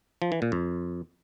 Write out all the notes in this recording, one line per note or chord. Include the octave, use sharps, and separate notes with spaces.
F3
E3
A#2
F2